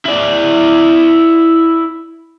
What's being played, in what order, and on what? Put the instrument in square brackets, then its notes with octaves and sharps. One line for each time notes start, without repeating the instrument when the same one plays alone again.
[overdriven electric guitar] E4 D5